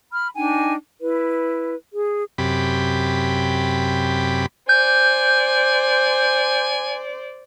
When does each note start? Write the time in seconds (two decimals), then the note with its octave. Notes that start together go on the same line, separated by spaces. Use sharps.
0.12 B5 F6
0.35 D4 D#4 G5 G#5
1.01 E4 B4
1.92 G#4
2.38 F#2 C3 G4 B5
4.69 C5 D5 G#5 G6